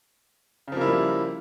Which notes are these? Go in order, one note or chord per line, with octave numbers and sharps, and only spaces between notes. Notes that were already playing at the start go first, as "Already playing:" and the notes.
C#3 F3 G3 A#3 E4